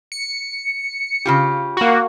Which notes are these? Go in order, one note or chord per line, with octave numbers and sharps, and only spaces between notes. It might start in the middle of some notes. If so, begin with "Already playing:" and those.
C#7
C#3 F4 G4
A#3 F#4